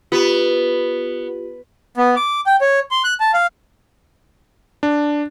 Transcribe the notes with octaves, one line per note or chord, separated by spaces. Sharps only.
B3 F4 G4
B3
D6
G5
C#5
C6
F#6
A5
F5
D4